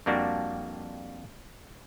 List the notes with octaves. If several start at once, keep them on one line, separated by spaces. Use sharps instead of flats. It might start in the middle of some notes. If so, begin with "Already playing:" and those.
F2 G3 A#3 D4 F#4